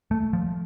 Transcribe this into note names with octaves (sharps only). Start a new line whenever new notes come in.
A3
F3